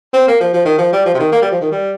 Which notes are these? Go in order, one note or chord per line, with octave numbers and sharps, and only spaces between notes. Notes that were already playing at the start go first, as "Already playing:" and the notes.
C4
A#3
F3
F3
D#3
F3
G3
F3
C3
D#3
A#3
G3
F3
D#3
G3